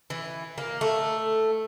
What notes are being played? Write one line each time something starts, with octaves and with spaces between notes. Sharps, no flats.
E3
A#3
A3